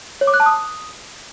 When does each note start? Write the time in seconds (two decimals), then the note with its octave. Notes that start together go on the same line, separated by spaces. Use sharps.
0.21 C#5
0.27 D6
0.34 F#6
0.40 A5
0.46 D#6